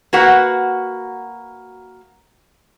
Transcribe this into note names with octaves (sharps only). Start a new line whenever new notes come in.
A#3 F#4 B4 F#5